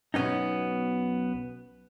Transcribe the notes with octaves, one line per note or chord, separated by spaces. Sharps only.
B1 B2 B3 C#4 D#4